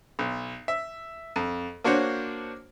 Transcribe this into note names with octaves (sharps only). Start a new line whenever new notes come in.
B1
E5
F2
A#3 D4 F#4 C5 C#5